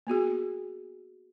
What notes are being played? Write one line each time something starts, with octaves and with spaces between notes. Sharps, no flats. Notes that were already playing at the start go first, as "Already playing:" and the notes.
A#3 B3 F#4 G#4